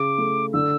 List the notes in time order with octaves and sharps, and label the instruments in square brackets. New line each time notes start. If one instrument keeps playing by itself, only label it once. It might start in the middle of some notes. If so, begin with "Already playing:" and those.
Already playing: [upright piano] C#3 [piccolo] D6
[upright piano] A3
[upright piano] D3 [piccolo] E6